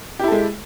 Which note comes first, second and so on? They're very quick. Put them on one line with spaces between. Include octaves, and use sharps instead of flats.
G4 E4 A4 G#3